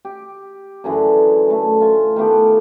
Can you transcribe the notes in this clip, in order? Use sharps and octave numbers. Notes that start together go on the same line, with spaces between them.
G4
F#2 D3 E3 G#4
A3
F4 G#5
D#3 A3 B3 G4